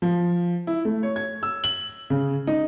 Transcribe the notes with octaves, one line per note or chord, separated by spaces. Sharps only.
F3
E4
A3
C#5
G#6
E6
F#7
C#3
D#4